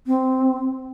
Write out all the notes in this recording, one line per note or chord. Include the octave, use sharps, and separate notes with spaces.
C4